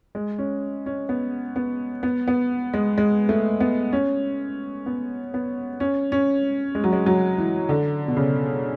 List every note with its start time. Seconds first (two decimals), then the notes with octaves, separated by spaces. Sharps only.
0.15 G#3
0.38 C#4
0.86 C#4
1.09 B3
1.56 B3
2.03 B3
2.28 B3
2.74 G#3
2.98 G#3
3.29 A3
3.60 B3
3.93 C#4
4.86 B3
5.34 B3
5.80 C#4
6.12 C#4
6.75 G#3
6.84 F#3
6.92 G#3
7.06 F#3
7.38 E3
7.69 D3
8.08 B2
8.17 C#3